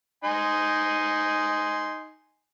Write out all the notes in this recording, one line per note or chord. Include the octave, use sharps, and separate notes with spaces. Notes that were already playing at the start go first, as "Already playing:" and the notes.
D#4 G#5 C6